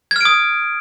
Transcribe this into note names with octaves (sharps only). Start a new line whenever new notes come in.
D#6 F6 G#6 D7